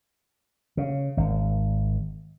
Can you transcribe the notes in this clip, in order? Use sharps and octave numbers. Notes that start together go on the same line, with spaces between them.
C#3
G#1